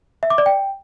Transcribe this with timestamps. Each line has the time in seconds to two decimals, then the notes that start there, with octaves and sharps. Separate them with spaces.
0.23 E5
0.30 D6
0.38 D5
0.46 G5